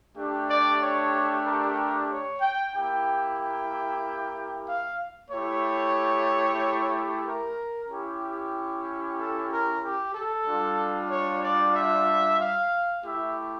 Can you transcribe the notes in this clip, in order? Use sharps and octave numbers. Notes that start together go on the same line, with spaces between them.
A3 D4 G4
D5
C#5
A#4
C#5
G5
A#3 E4 G4 G5
G5
F5
A3 E4 G4 C#5
A#4
C#4 E4 G4
A4
A#4
G4
A4
G3 D4 F4
C#5
D5
E5
F5
A3 E4 G4 E5